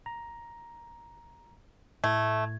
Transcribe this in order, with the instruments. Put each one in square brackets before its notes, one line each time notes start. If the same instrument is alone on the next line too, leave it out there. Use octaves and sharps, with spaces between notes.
[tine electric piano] A#5
[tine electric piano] A2 G#6 [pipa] A3